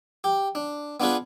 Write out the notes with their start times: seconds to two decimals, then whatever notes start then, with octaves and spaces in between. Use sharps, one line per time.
0.24 G4
0.55 D4
1.00 B3 D4 F4 G#4 B4